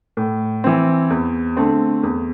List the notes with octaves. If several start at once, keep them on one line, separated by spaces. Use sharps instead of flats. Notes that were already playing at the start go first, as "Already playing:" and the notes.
A2
E3 C4
E2
D3 A3 C4
E2